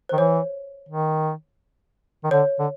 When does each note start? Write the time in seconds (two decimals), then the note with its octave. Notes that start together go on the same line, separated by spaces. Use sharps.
0.09 D#3 C5
0.18 E3 C#5
0.89 D#3
2.24 D#3
2.31 D3 C#5
2.59 D3